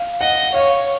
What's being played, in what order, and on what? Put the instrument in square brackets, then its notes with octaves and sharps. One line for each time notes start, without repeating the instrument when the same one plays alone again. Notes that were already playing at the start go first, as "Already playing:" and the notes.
Already playing: [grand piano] F5
[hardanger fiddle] D#5 [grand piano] F#5
[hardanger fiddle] C#5 [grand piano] F5